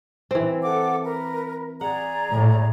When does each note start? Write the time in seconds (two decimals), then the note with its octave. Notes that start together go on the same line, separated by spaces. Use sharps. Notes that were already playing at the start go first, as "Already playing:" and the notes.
0.31 E3 C4
0.64 A4 F#5 D6
1.03 A#4 B4
1.81 G#4 D5 F#5 A#5
2.32 A2